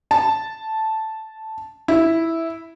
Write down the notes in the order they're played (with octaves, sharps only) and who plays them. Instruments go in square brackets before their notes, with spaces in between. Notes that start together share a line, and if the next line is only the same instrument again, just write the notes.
[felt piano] A5
E4